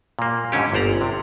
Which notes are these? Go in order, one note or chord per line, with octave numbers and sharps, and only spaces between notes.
A#2 A#3
G#2 D3 C#4 G4
G1 C5 D5 A#5
C3